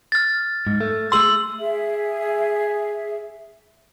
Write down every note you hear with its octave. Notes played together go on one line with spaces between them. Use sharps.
F6 A6
G#2
A3
A3 G#4 C6 E6 F#7
G#4 E5